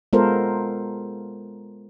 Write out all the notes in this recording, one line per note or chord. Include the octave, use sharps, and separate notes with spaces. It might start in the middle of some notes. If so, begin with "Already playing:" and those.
G#3 B3 F4 A4 A#4 C5